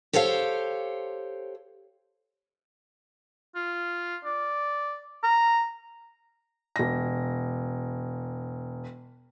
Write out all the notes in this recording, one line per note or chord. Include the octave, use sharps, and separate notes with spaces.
G4 A4 C5 C#5 F5
F4
D5
A#5
E1 A#6